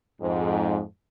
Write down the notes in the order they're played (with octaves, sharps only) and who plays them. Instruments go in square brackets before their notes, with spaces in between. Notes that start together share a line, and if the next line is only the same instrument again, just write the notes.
[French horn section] F2 G#2